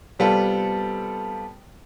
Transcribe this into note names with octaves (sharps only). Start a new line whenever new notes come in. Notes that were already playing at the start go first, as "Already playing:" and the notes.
C3 G3 B3 F4 A4